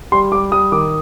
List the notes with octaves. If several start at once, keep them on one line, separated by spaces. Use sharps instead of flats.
G3 C6
G3 D6
G3 D#6
D#3 D6